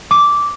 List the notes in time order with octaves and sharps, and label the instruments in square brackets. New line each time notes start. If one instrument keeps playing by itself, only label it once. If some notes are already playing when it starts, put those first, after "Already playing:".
[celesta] D6